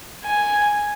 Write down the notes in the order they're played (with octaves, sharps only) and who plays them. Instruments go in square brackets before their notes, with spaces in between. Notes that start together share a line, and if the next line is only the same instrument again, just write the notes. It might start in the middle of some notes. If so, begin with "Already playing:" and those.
[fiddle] G#5